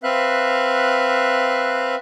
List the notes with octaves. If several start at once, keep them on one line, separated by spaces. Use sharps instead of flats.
C4 B4 E5 F5 F#6